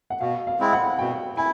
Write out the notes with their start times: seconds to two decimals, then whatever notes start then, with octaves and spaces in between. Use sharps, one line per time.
0.10 F#5
0.21 B2 F5
0.47 F5
0.59 G#3 C4 E4
0.73 F#5
0.99 B2 G5
1.37 E4 G#5